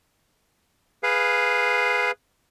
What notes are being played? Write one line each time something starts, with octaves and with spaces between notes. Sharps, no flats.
G#4 B4 F5